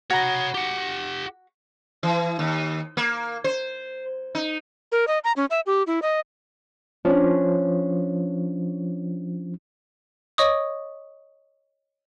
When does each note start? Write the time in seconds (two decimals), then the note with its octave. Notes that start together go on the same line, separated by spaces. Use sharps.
0.10 F#4 C#5 A#5 B5
0.55 G4 F#5
2.03 E3
2.39 D#2
2.97 A#3
3.44 C5
4.35 D#4
4.92 A#4
5.07 D#5
5.24 A#5
5.36 C#4
5.50 E5
5.66 G4
5.87 E4
6.02 D#5
7.05 F3 C#4 D4
10.38 C#5 D#5 C#6 D#6